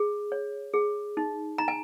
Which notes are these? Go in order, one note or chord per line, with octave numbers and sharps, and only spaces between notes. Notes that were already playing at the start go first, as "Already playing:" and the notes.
Already playing: G#4
C#5
G#4
D#4
D#4 A#5
G#5